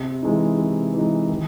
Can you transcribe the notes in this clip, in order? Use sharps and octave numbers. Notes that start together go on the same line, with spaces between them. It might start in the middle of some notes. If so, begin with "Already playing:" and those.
Already playing: C3
E3 G#3 D#4
C3
E3 G#3 D#4
D#3